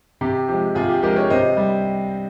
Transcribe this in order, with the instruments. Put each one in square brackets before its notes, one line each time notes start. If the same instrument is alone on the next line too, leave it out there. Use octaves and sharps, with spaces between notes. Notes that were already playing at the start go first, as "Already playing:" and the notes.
[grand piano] C3 G4
F3 G#3 G4
C3 F4 G#4
G4
F3 G#3 G4 A#4
A#4 C#5
C3 C5 D#5
G3